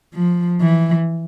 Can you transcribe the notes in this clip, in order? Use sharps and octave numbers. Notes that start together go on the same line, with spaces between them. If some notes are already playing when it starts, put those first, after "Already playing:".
F3
E3